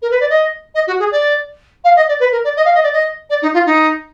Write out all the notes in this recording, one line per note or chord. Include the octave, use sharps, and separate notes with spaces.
A#4
B4
D5
D#5
D#5
F#4
G#4
D5
F5
D#5
D5
B4
A#4
D5
D#5
F5
D#5
D5
D#5
D5
D#4
F4
D#4